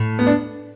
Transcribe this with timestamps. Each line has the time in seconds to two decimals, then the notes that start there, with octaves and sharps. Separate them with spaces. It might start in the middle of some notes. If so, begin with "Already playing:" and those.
Already playing: A2
0.19 B3
0.27 D4